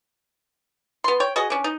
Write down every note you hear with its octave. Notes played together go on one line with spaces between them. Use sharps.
B3 C6
C#5 G5
F#4 G#4 D#5
C#4 D4
D#4